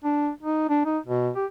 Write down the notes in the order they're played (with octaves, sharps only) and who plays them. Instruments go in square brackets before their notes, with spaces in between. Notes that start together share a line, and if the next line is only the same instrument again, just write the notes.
[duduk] D4
D#4
D4
D#4
B2
G4